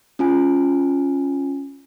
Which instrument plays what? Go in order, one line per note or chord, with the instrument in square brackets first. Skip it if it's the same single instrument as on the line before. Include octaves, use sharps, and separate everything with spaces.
[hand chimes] C#4 F4 G#5